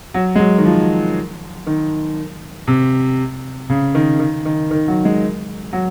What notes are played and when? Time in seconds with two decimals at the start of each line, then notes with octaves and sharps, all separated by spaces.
0.14 F#3
0.35 G#3
0.39 F#3
0.58 D#3
0.65 F3
1.67 D#3
2.68 C3
3.70 C#3
3.95 D#3
4.20 D#3
4.45 D#3
4.71 D#3
4.88 F#3
5.05 G#3
5.73 F#3